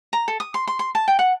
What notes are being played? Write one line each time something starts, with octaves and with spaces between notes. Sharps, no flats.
A#5
A4
D#6
C6
C6
C6
A5
G5
F#5